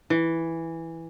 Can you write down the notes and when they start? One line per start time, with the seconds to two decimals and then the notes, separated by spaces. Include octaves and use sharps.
0.10 E3